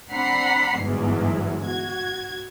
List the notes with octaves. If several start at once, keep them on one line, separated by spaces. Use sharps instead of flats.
C4 D4 F#5 A#5 B5 C7
G1 E2 G#2 E3 F#3
F#4 G#6